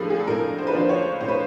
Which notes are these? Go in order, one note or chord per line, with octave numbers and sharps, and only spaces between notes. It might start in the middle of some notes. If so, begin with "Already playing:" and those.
Already playing: A2 F3 A#3 D4 G#4 A4
G#4
A4
A2 A#4
C5
B4
F3 A#3 D4 C5
C#5
A2 C5
B4